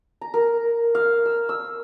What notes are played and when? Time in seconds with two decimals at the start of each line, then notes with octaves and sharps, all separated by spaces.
0.21 A#5
0.34 A#4
0.95 F5
1.26 E6
1.49 E6